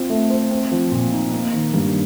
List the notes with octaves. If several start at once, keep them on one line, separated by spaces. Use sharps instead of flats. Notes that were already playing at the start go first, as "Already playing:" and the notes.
Already playing: C4 F4
A3
C5
C4
F3
A#2
D#4
A#3
D#3
G2